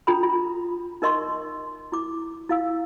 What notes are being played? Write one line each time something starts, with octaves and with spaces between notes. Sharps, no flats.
D4 F4 A4 G5 A#5 B5
F4
D#4 A#4 D#5 C6 C#6
E4 D6
E4 F5 E6